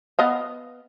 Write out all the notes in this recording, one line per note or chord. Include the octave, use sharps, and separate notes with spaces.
B3 D#5 F5